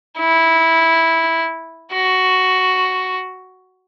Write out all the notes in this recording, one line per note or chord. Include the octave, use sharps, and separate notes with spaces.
E4
F#4